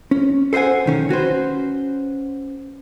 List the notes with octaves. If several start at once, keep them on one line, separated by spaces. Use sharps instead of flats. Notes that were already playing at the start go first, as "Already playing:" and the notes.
C#4
A4 C5 D#5 F#5 G#5
B1 D#3 C#4
C#4 F#4 B4 C5